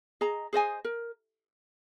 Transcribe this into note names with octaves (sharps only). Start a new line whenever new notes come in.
G#4 D#5 A#5
G#4 C5 D#5 G#5
A#4